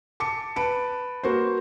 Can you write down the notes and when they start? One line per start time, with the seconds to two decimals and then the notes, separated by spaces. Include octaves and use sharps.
0.20 A5 D6 C#7
0.56 B4 A5 D7
1.23 A#3 F#4 B4 C5